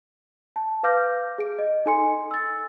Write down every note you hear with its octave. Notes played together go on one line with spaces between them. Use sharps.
A5
B4 F5 D6 F6 G6 A#6
G#4 D7
D#5
D#4 A4 G#5 C6 C#7
E6 A6